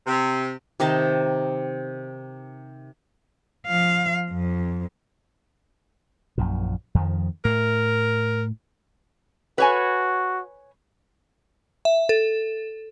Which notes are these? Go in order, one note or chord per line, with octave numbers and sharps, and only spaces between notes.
C3
C3 D#3 D#5 A5
F3 F5
F2
A#1 F#2 A#2
F2 D#3 F3
A2 A#4
F#4 B4 C#5 G#5
E5
A4